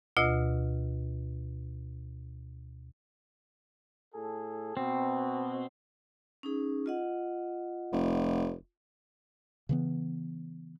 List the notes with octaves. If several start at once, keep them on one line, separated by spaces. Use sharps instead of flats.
D2 B2 F4 D#5 E6
A2 G#4 A4
B2 C4
C#4 D#4 G#4
F4 D#5 F#5
F1
C#3 E3 B3